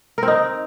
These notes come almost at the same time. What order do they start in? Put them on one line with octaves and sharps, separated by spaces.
A#4 C4 D#4